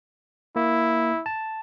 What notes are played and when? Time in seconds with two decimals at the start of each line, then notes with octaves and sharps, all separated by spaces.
0.56 A#3 E4
1.26 A5